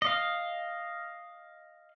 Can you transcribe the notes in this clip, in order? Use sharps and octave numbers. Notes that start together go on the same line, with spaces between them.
D#5 F5